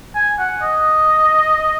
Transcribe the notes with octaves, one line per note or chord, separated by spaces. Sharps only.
G#5
F#5
D#5